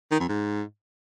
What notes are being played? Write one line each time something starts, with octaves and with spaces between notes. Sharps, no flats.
D#3
F2
G#2